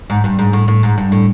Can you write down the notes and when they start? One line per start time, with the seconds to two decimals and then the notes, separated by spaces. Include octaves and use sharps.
0.10 G#2
0.24 G2
0.39 G#2
0.53 A2
0.68 A2
0.83 G#2
0.98 G2
1.12 A2